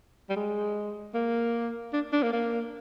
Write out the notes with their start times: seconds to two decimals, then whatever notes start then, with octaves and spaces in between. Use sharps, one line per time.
0.29 G3
0.36 G#3
1.14 A#3
1.93 D4
2.13 D4
2.22 A#3
2.33 A#3